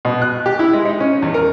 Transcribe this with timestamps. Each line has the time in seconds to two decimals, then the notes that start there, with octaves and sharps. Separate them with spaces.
0.05 B2
0.22 F#6
0.46 G4
0.59 E4
0.73 G#3
0.85 D#4
1.00 C#4
1.22 E2
1.34 A#4